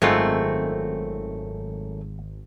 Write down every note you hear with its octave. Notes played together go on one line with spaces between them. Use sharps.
G#1 F#2 G#3 A3 C4 F4